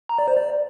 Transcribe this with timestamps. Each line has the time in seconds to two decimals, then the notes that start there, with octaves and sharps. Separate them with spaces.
0.09 A#5
0.18 D5
0.28 C5
0.37 D5